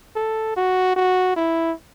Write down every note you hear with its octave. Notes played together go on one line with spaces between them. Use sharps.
A4
F#4
F#4
E4